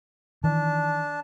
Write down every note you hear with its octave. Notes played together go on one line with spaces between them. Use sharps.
D#3 E3 D4 A5